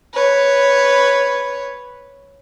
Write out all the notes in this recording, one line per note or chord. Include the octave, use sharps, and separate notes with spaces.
B4 C#5